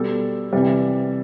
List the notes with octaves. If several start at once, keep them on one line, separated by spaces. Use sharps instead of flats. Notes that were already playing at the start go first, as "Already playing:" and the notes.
Already playing: B2 G3 A4
C3 E3 G3